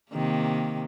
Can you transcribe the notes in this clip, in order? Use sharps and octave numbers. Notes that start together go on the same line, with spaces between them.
C3 D#3 A#3